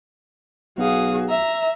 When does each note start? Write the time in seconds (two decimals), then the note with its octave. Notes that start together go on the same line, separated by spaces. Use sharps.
0.78 B1 F#4 G#4 F5 D#6
1.29 E5 A#5